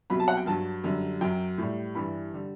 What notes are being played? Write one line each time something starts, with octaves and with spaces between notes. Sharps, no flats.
C2 B2 F#3 B5
A5
F#5
G5
G2 F#3 A5
F#2 D3 G3
F#2 F#3 G5
A2 G3
G2 E3 G3 B5
D3 G3